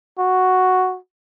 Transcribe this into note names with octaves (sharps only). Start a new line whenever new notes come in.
F#4